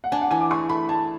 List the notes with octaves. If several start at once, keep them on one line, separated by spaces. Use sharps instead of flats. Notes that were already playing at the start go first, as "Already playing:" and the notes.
F#5
D4 G#5
F#5
E3 G#5
D6
G#4 C#6
A3 B5
G#4 A5